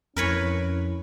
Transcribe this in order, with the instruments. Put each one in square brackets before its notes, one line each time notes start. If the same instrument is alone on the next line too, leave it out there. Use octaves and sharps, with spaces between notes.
[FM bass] F2 [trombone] C#4 [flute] E4 [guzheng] A#4 B4 C#5